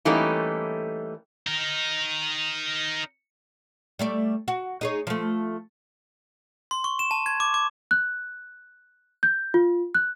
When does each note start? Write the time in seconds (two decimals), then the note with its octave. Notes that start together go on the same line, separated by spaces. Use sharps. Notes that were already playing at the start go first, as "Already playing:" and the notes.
0.05 E3 G3 A3 A#3 C#4 D#4
1.47 D#4 A#4
3.99 G3 A3 D5
4.48 F#4
4.81 D#4 G#4 C#5
5.07 F3 A3
6.71 C6
6.84 C#6
6.99 E7
7.11 A5
7.26 G#6
7.40 D6
7.54 D6
7.91 F#6
9.23 G6
9.54 F4
9.95 F#6